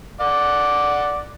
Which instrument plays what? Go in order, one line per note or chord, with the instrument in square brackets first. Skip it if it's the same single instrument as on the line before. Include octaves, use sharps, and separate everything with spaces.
[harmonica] D5 F#5 D6